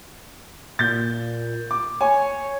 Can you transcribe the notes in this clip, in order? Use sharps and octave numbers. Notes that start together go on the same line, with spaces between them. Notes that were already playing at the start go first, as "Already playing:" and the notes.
A#2 G6 A6
D6
C#5 G#5